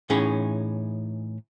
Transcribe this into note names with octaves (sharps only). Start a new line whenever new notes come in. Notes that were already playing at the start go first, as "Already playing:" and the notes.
A2 E3 C#4 D#4 G#4